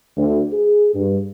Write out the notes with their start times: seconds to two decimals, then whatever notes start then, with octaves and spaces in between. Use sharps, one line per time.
0.17 D2
0.52 G#4
0.94 G2